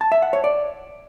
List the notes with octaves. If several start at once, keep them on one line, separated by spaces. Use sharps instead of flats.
A5
E5
F#5
C#5
D5